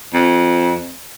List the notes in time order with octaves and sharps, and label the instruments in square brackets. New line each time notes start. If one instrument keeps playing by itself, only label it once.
[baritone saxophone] F2